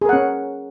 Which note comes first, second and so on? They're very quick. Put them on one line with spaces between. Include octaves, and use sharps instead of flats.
G#4 A#4 F#5 C#4